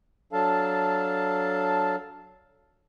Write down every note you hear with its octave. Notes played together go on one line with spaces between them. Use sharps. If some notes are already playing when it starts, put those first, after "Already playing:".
F#3 D4 A4 F5 A5